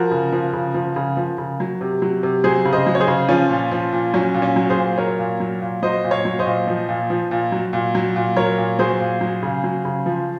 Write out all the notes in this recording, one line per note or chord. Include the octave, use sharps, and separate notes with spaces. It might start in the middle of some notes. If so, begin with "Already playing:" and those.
Already playing: F3 F#4 A#4
C#3
F3
C#3
F3
C#3
F3
C#3
F#3
C3
F#3
C3
F#3 G#4 C5
C#3
C5 D#5
F#3
C#5
G#4 C5
C#3
F3 C#4 F4
A#2
F3
A#2
F#3 C#4
A#2
C#4
F#3
G#4 C5
A#2
F#3 A#4 C#5
A#2
F#3
A#2
F#3 C5 D#5
A#2
C#5 F5
F#3
C5 D#5
A#2
F3
A#2
F3
A#2
F#3
A#2
F#3
A#2
F#3 A#4 C#5
A#2
F#3 G#4 C5
A#2
F#3
C#3
F#3
C#3
F3